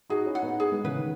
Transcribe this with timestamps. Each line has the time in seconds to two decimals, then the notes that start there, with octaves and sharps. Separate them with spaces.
0.10 D#4 F#4 G#4
0.26 C#4 E4
0.35 F#5
0.43 B3 D#4
0.60 G#4
0.71 G#3 B3
0.84 C#3 E3 B4
0.96 D#3